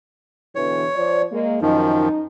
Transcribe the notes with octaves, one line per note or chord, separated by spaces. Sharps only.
B2 D3 E3 C#5
F3 C5 D5
G#3 A#3
F#2 D#3 F3 D#4